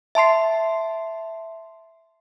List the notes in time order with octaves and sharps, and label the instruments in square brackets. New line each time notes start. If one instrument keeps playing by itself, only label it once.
[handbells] E5 A5 C6 C7